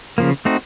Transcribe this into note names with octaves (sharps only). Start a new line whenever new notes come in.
C#3 F3 A#3
A3 C4 D#4 F#4